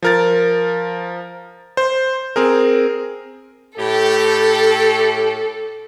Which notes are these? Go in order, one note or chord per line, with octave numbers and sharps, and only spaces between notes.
F3 A#4 A6
C5
C4 G#4 A#4
A2 G4 A4